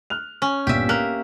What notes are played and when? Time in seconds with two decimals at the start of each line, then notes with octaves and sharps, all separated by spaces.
0.10 F6 F#6 F7
0.42 C#4
0.67 G1 A#2 G4 E5
0.89 A#3 F#6